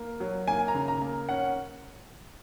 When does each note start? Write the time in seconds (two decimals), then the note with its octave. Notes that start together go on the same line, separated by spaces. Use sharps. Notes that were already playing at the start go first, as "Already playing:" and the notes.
Already playing: A#3
0.20 F#3
0.48 A#3 G#5
0.68 A#5
0.74 C#3
0.88 A#5
1.01 A#3
1.29 C#4 F#5